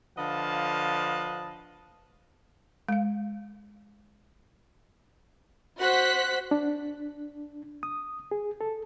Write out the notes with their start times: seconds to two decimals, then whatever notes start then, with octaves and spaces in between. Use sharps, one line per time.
0.18 D3 F3 B4 D#5 F5 A5
2.89 G#3 F5
5.79 F#4 C5 F#5 F#6 B6
6.51 D4
7.83 D#6
8.31 G#4
8.61 A4